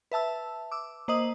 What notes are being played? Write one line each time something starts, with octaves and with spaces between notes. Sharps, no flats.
B4 E5 A5 E6
D6 E6
A#3 C5 D#5 D#6 F#7